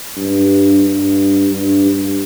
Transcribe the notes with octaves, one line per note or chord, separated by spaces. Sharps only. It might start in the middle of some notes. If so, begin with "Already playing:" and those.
G2
G2
G2
G2